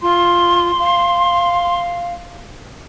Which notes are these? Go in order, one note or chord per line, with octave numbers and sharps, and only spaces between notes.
F4 C6
F5